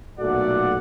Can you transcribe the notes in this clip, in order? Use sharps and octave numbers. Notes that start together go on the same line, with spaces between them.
B1 A#2 A3 F#4 D5 F#5